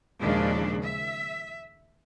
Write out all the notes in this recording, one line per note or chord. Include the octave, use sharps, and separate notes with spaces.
D#2 A#2 C#3 F3 G#3 D4
E5